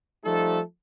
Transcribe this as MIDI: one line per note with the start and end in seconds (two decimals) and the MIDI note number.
0.24 0.60 53
0.24 0.60 55
0.24 0.60 57
0.24 0.60 63
0.24 0.60 69